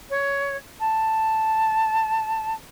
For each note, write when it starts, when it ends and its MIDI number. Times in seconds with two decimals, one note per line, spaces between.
0.10 0.57 73
0.80 2.54 81